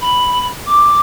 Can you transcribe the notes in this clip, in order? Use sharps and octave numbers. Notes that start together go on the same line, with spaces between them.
B5
D6